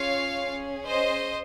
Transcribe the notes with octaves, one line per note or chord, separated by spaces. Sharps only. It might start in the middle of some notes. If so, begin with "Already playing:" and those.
Already playing: C#4 F4 G#4 C#5 F5
C#4 G#4
C5 D#5